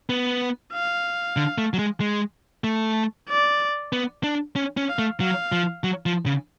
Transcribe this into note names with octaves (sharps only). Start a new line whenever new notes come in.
B3
F5
D3
A3
F#3
G#3
G#3
A3
D5
B3
D4
C#4
C#4
F5
A3
F#3 F5
F3
F#3
F3
C#3